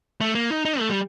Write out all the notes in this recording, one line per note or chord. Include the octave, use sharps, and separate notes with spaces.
A3
A#3
D#4
D#4
A3
G3